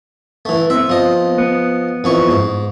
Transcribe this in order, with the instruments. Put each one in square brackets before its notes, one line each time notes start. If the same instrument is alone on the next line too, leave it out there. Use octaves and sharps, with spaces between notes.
[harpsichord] E3 A3
[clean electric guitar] B3 C4 [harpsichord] E5
[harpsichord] F3 D#5
[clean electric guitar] B3
[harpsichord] F2 E3 C#6
G#2